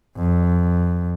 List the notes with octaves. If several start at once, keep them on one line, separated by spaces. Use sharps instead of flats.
F2